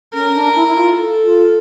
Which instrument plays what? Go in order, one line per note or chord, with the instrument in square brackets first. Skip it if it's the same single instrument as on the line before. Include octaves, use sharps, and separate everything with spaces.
[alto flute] C#4 [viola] A#4
[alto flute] D4
E4
E4
F4
[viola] A4
[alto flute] F4